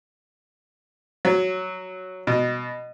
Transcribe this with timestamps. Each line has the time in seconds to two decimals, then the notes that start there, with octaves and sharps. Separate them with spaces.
1.25 F#3
2.27 B2